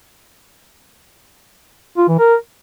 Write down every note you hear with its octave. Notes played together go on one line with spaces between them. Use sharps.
F4
E3
A#4